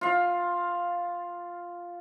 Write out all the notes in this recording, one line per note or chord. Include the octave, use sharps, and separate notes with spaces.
F4 F5